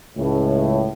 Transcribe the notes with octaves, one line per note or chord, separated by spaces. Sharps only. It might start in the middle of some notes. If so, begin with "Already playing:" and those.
C#2 A2